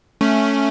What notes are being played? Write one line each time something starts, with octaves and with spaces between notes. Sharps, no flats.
A3 C#4